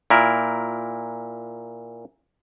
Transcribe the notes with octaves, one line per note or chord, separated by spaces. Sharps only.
A#2 E4 A#4